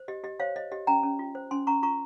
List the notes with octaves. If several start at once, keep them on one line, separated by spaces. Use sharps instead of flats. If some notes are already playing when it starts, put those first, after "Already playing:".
Already playing: C5
G4 D#5
G4 D#5
C5 C#5 F5
C5 D#5
G4 D#5
C#4 G5 A#5
C#4
F4
C5
C#4 G#5 C6
C#4 A#5 C#6
F4 A#5 C#6